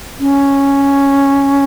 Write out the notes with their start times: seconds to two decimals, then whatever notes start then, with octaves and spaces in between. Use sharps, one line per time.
0.20 C#4